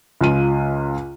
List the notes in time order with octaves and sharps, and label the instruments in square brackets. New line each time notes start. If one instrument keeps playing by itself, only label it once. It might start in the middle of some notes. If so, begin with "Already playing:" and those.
[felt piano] C#2 F4 D#7